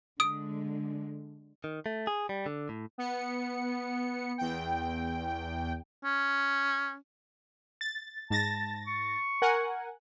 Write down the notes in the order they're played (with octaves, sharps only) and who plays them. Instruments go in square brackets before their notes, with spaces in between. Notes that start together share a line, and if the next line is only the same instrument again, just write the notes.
[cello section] D3 G#3 [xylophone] D#6 D7
[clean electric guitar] D#3
A3
G#4
G3
D3
A2
[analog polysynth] B3 C#7
E2 G5
[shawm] C#4
[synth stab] A6
[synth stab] G#2 A6 A#6 [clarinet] A5
[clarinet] C#6
[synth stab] A#4 F#5 G#5